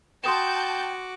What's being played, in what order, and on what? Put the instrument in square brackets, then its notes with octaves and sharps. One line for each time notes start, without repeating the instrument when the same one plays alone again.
[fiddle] F#4 D6 [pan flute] G5 [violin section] A5 G6 [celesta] C6 D#6 E7